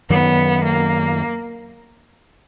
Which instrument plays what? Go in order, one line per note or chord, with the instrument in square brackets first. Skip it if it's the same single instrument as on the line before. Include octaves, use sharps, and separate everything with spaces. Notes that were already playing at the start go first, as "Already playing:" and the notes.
[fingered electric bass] F#2 D#3 F#3 [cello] B3
[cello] A#3